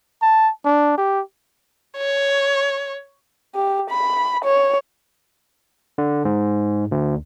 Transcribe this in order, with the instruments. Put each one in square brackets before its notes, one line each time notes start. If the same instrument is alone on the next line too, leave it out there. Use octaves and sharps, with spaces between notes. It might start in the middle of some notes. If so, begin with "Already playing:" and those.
[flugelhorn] A5
D4
G4
[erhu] C#5
[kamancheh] G4
B5
C#5
[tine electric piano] D3
G#2
D2